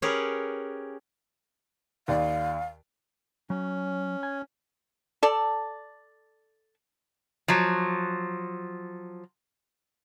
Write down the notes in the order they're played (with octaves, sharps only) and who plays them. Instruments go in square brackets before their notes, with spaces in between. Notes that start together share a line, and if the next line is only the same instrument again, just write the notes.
[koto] C#4 G4 G#4 A#4 B4
[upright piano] D#2 D5 [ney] F5
[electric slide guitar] F#3 [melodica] C#4
[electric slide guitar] G#5
[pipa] A4 D5
[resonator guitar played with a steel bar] F3 F#3